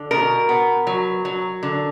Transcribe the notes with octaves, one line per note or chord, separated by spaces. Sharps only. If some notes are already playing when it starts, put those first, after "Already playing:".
Already playing: D3
B2 A#4
B3
F#3
F#3
D3